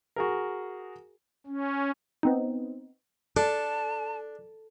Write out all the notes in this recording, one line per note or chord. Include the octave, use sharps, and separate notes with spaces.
F#4 G#4 A#4
C#4
B3 C4 D#4
D4 A4 A5